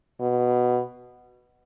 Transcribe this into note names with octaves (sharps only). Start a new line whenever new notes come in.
B2